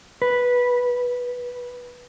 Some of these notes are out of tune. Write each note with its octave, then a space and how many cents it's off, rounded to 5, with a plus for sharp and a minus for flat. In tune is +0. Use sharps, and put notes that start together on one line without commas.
B4 -10